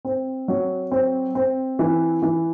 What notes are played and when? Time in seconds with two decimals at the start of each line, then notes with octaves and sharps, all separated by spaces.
0.05 C4
0.48 F#3
0.91 C4
1.35 C4
1.79 E3
2.22 E3